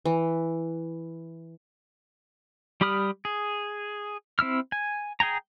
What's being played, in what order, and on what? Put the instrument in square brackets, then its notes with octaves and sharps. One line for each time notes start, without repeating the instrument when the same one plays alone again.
[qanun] E3
[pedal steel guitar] G3 G4 B5 D#6 F6
G#4
C4 E4 E6 F6
G#5
G#4 G5 G#5 A#5